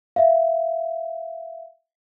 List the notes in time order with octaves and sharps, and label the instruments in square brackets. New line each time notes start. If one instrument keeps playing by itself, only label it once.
[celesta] E5 F5